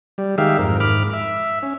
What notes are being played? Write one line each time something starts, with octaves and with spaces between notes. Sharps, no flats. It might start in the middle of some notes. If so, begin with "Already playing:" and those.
G3
D#3 G#3 G4 E5 F5
F2 G#2 A#4
G#2 B5 D6 F6
E5
C#4